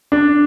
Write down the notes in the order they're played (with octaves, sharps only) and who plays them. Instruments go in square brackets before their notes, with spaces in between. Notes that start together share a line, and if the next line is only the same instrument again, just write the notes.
[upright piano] D4